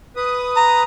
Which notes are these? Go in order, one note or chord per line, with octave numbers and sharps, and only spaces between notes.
B4 D#6
A#5